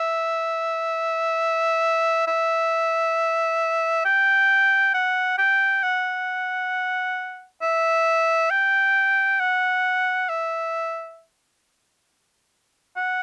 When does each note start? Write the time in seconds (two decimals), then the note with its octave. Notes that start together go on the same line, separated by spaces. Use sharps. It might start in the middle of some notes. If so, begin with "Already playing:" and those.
Already playing: E5
2.27 E5
4.05 G5
4.94 F#5
5.38 G5
5.83 F#5
7.62 E5
8.51 G5
9.40 F#5
10.29 E5
12.96 F#5